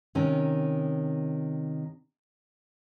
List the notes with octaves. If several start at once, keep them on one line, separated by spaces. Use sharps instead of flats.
C3 D#3 C#4